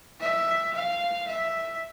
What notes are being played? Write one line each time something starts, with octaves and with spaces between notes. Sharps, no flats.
E5
F5
E5